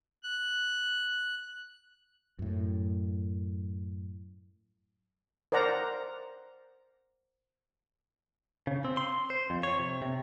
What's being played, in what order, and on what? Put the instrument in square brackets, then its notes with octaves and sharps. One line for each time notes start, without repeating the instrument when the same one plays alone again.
[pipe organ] F#6
[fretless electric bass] F#2 A2
[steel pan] A#4 C5 D5 F#5 A#5
[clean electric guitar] C#3
C4
C6
C5
F2
C#5
C3
C3